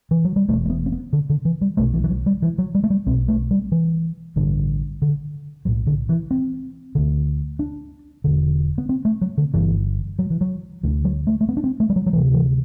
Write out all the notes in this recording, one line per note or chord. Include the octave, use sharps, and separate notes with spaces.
E3
F#3
G3
E1 E2 B2 A3
A3
B3
C4
B3
D3
D3
E3
G3
B1 B2 A3
E3
E3
F#3
G3
E3
F#3
G3
A3
G3
B1 B2 C4
A3
G3
E3
A1 G2 D3
D3
B1 A2 F#3
D3
E3
C4
D2 D3
D4
E1 E2 D3
B3
C4
A3
F#3
D3
G1 G2 D3 E3
F#3
E3
F#3
D2 D3 E3
F#3
A3
A3
B3
D4
C4
A3
G3
F#3
F#3
D2 C3 E3
E3